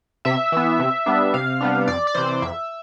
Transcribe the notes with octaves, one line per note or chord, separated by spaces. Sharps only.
C3 E5
E3 B3
C3
G3 B3 D4
C3 F5
G3 B3 D4
F2 D5
D5
C3 E3 C5
F2 E5